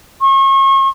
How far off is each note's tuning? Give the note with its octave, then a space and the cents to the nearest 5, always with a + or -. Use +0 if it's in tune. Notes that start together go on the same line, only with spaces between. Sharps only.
C#6 -35